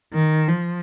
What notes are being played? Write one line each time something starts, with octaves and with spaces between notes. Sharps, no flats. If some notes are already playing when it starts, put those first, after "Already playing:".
D#3
F3